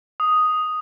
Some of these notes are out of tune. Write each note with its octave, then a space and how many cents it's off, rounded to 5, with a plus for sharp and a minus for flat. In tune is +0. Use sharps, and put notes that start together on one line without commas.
D#6 +0